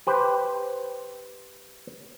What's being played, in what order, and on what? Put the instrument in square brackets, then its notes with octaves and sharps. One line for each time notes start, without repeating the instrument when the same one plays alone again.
[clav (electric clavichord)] G4 B4 C5